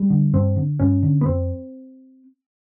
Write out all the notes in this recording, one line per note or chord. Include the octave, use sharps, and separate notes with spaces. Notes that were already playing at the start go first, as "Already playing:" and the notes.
Already playing: G3
D3
G2 C4
D3
G2 C#4
D3
B3
F2 C4